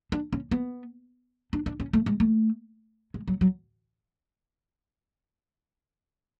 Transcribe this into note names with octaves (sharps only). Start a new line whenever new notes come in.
D4
C#4
B3
D4
D4
C#4
A3
G#3
A3
G#3
F#3
F#3